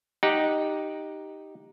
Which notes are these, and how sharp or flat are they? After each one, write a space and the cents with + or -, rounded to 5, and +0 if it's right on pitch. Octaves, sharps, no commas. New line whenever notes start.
D#4 +0 G4 +0 F#5 -10